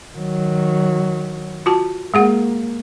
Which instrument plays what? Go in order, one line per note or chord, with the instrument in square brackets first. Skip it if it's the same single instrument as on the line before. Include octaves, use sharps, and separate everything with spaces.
[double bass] D#3 F#3
[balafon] F4 F#4 A5
[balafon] G#3 G#4 F#5 [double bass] A#3